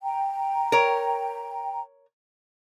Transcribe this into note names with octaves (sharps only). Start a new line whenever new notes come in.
G5 A#5
A#4 C#5